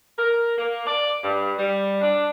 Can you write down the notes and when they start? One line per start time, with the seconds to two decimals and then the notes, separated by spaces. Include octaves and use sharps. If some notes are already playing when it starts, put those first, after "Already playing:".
0.19 A#4
0.58 A#3
0.87 D5
1.24 G2
1.58 G3
2.01 D4